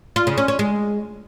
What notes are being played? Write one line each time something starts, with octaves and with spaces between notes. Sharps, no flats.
F4
C#3
C#4
C#4
G#3